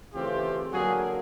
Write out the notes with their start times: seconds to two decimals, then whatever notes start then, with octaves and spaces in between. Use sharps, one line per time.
0.13 C#3 E3 A3 C4 F4 G4
0.72 D3 F#3 A#3 F#4 G#4